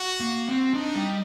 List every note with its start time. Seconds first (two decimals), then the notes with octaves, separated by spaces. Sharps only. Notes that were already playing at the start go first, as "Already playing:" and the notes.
Already playing: F#4
0.20 A#3
0.47 C4
0.74 D4 D#4
0.95 G3